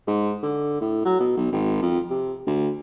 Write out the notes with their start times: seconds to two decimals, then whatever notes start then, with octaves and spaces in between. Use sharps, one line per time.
0.07 G#2
0.43 D3
0.81 A2
1.05 F#3
1.20 B2
1.37 B1
1.52 G#1
1.82 F2
2.10 C3
2.47 D2